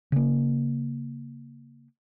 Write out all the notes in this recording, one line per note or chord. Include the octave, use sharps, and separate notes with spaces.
C#3 A#3